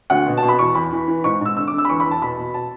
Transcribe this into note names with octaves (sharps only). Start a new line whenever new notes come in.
D2 F#5
B2
A5
B2
B5
E2 C#6
E2 B5
E3
E3
G#2 C#6
G#2 E6
D3 E6
D6
D3
E6
B5
E2 C#6
B5
E2
A5
B2 B5
B2
A5